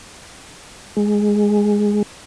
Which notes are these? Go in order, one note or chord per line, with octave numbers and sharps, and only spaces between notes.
G#3